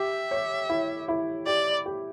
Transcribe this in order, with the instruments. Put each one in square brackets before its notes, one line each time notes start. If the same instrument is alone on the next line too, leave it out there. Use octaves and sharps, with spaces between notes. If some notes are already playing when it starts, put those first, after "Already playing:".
Already playing: [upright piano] G4 [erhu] E5
[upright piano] C#5
E4
E4
[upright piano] G4 [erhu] D5
[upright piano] G4